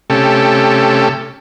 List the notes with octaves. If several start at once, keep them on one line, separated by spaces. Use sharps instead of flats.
C3 A3 C#4 G4 A4